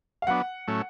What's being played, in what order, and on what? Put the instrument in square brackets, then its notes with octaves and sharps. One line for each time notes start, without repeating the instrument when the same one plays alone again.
[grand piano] F5
[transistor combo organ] F#3 B3 D4 [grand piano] F#5
[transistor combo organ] A2 F#3 A3 C#4